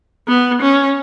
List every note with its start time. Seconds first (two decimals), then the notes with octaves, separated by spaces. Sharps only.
0.28 B3
0.62 C#4